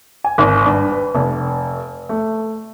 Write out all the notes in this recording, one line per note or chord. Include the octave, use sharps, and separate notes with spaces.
G#5
G#1
G2
B4
F1
A3